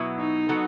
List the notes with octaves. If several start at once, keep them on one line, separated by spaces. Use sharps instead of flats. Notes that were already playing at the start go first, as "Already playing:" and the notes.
Already playing: B2 F#3 B3 E4
D#4
F#3 B3 F#4 A4